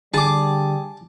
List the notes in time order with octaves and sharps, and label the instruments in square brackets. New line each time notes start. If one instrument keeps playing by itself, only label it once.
[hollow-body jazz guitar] D3 [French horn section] G3 [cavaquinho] G#4 [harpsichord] A5 D6